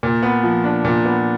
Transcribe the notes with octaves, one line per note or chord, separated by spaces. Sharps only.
A#2
B3
F3
D4
A#2
B3